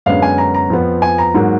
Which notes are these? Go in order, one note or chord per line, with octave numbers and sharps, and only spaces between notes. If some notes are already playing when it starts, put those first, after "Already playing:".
F#2 D3 G#3 B3 F5
G#5
A#5
A#5
F2 F3 B3
G#5
A#5
G#2 F#3 A#3